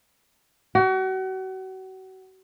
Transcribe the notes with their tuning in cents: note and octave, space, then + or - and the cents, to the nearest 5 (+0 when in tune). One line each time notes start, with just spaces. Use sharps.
F#4 +35